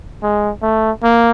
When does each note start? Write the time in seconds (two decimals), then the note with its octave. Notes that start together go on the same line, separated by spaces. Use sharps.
0.23 G#3
0.63 A3
1.03 A#3